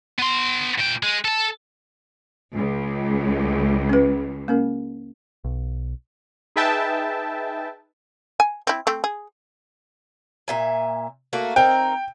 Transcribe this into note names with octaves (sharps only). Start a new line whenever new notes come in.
B3 C6
A#2 G5
G#3
A4 A5
C#2
C#4 B4
A#3 C#4 A#4
B1
D#4 G#4 B4 E5 G5 A5
G#5
C4 E4
A3 C4
G#4
A#2 E5 G#5
A3 A#3 F#4
C4 D#4 A#4 G5